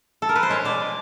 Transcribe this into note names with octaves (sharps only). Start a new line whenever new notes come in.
A4
A#4
B4
C5
G#3 C#5
B2 D5
G#3